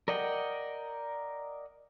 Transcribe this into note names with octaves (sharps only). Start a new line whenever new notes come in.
A#4 D5 D#5 F#5 G5